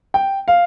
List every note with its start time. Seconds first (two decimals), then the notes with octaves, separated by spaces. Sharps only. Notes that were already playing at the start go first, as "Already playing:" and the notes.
0.14 G5
0.48 F5